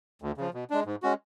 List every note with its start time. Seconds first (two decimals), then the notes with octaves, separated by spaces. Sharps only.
0.22 D2
0.38 C#3 F3
0.54 B2
0.70 G#3 D4
0.86 G#2
1.03 G#3 C#4 F#4